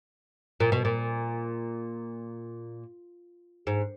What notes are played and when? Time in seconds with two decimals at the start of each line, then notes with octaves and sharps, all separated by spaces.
0.60 A#2
0.72 B2
0.85 A#2
3.67 G#2